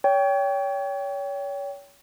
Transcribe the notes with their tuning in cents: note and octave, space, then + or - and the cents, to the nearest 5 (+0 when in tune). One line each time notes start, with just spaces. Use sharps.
C#5 +30 G5 +0